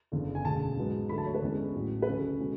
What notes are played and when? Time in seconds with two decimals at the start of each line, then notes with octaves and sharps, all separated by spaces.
0.12 F#1 E2 D3
0.35 G#5
0.45 E1 D2 C#3 A5
0.77 G#2 F#3 B3
1.09 D2 D3 F#3 A3 B5
1.18 A5
1.26 C#5
1.34 B4
1.42 E2 D3 G#3 C#4
1.75 A1 A2 F#3
2.02 B4
2.07 D2 C#3 F#3 C#4 A4
2.39 B2 G#3 C#4